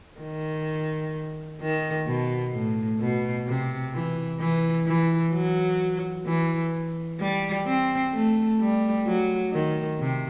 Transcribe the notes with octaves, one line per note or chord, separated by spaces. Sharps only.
D#3
D#3
B2
A2
B2
C3
E3
E3
E3
F#3
E3
G3
C4
A3
G3
F#3
D#3
C3